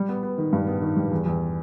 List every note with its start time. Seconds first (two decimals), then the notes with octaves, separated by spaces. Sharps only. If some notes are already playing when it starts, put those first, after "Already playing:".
Already playing: G3
0.09 B3
0.23 B3
0.38 D#3
0.53 G2
0.67 B3
0.82 D#3
0.96 G3
1.11 E2
1.26 E2